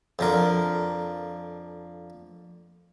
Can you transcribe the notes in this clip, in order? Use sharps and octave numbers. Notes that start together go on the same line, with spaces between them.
F2 D3 A#4